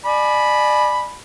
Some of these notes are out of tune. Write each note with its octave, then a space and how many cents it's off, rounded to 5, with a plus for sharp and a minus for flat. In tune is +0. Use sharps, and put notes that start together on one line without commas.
D5 +30 G#5 +35 B5 -5